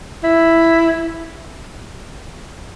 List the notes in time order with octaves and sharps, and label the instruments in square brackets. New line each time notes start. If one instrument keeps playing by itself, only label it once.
[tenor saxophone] E4